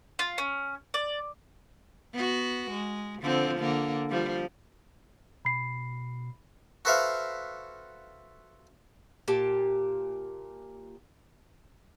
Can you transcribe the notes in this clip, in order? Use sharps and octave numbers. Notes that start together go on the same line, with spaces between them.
F4
C#4
D5
B3 F#4
G#3
D3 F3 C4
D3 A#3
F3 G3
B2 B5 C7
F#4 A4 B4 C5 E5 F5
A#2 G4 A5